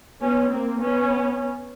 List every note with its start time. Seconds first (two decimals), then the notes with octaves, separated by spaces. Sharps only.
0.21 B3 C#4
0.50 A#3 C4
0.79 B3 C#4